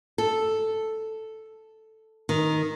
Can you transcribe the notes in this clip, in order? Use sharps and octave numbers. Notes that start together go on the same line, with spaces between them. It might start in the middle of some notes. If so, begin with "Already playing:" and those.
A4
D#3